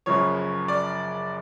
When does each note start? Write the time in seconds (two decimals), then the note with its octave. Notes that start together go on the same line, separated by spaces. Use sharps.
0.06 F#1 F#2 C#3 F3 C#5
0.68 D5